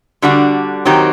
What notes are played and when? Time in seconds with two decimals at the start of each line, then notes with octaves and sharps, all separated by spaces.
0.22 D3 G3 D4 F#4
0.85 D#3 F#3 C4 D#4 G4